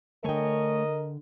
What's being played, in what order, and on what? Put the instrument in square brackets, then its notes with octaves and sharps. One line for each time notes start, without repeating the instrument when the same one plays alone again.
[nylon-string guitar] D3 G5 [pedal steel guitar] A3 C#5 G#5 [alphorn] A#4 [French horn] D#5